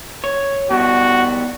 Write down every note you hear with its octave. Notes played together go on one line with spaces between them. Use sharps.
C#5
B2 G3 F#4